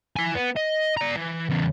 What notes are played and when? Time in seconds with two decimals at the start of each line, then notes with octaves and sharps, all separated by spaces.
0.16 E4 G#5
0.35 B3
0.56 D#5
0.97 D5 A#5
1.16 E3
1.50 E2 C#3